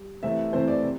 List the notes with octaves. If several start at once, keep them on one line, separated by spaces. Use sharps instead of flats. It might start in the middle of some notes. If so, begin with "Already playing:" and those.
Already playing: G3
C3 E3 A3 C4 E5
C3 E3 A3 C4 C5
D5
C3